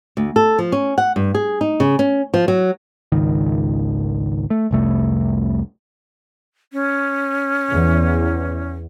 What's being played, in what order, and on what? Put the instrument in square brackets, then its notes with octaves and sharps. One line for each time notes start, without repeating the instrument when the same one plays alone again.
[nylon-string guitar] D2
A4
F3
C#4
F#5
G2
G#4
D#4
C#3
C#4
F3
F#3
[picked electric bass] G#1 C#2 D#3
A3
F1 C2 A3
[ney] C#4
[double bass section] E2